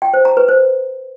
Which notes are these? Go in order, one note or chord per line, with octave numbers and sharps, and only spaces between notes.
G5
C5
A#5
B4
C5